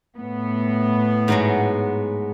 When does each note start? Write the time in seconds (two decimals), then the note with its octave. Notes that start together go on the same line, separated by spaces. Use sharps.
0.16 A2 B3
1.28 G#2 F#3 G#3